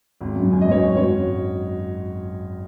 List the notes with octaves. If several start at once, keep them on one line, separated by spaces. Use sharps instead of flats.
G#1
F#2 F#3
G#1 G#5
D#5
F#2 F#3 C#5
G#1
F#2 F#3 C#5
G#1